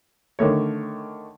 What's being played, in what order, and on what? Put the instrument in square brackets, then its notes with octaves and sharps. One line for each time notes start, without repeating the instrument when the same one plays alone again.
[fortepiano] D3 D#3 A3 C#5